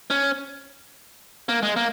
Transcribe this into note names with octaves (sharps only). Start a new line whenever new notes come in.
C#4
A#3
G#3
A#3